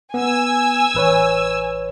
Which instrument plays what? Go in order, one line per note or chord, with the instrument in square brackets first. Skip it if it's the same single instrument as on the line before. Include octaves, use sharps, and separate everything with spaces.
[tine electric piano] B3 [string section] G#5 E6
[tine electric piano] A1 B4 C#5